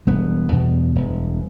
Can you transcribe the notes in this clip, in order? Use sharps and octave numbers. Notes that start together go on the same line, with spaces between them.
E1 G3 B3
E2 B2
E1